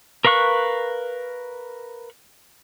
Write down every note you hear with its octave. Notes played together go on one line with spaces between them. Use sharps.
A#4 B4 F5 C#6 F#6